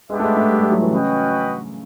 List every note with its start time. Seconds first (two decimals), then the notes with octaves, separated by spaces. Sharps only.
0.09 G#3 B3 D4 G4 B4 E5
0.20 A3
0.24 G#3
0.37 A3
0.50 G3
0.61 G3
0.72 F#3
0.82 E3
0.91 C#3 C#4 F#4 B4 D#5 G5